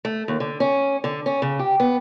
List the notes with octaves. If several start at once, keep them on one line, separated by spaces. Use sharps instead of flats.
A3
D#2
D3
C#4
D3
C#4
C#3
G4
B3